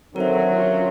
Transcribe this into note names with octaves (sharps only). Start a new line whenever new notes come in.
D3 D#3 F#3 C4 A#4 E5
C#4 F4 G4